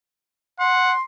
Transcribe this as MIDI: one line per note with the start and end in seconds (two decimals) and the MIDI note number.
0.60 0.95 78
0.60 1.02 84